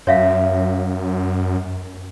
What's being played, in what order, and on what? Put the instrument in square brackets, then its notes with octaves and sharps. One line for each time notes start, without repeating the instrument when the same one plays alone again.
[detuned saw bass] F#2 [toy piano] C#5 E5 F5